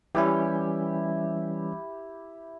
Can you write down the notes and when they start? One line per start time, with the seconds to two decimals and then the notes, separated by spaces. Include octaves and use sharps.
0.15 E3 G3 C#4 E4 G4